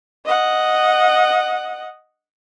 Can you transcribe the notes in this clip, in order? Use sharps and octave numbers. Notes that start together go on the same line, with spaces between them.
D#5 F#5